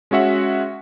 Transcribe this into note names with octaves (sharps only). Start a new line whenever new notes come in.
G#3 C#4 F#4 E5 F#5